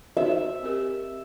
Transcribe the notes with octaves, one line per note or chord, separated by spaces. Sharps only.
D#4 F#4 C5 E5
C4 G4 A#4